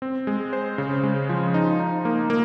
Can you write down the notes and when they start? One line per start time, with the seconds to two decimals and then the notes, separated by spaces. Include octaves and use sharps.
0.02 C4
0.27 G#3
0.53 C5
0.78 C#3
1.03 G#3
1.29 F3
1.54 D#4
1.80 D#4
2.05 A#3
2.30 A#3